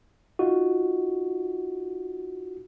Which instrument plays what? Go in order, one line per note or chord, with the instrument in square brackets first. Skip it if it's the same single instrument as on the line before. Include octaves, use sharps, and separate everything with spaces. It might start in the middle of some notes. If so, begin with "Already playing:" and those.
[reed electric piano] D#4 F4 [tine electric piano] F#4